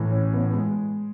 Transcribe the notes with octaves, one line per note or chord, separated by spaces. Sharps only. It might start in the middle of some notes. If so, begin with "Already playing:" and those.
Already playing: A2 E3
C#4
B3
G#3